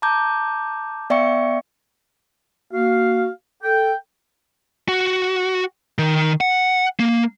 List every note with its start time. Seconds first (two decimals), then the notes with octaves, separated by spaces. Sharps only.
0.02 A5 A#5 D6 G6
1.10 B3 D5 E5 G5 C#6 C#7
2.72 A#3 F#4 F5
3.63 A4 G5
4.89 F#4
5.98 D#3
6.41 F#5
7.00 A#3